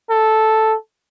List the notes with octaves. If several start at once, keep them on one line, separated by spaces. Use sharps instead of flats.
A4